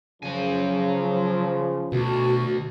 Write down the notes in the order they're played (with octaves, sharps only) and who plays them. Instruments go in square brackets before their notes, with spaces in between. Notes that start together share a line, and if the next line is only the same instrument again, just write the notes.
[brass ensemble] C#3 F3 [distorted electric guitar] F#3 G#5
[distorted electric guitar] D2 [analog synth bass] B2 [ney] F#4